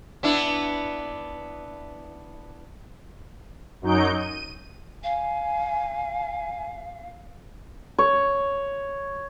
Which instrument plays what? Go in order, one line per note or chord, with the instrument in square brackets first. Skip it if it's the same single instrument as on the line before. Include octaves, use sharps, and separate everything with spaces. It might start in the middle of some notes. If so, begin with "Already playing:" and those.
[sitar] B3 D4 E4
[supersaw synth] F#2 F#3 D#4 G6 D7
D#7
[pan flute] F5 [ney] G#5
[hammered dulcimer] C#5